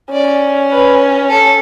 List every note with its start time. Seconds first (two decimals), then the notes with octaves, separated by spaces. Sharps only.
0.13 C#4 D5
0.71 B4
1.30 A4